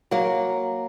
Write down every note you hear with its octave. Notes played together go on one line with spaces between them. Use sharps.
F#3 A#3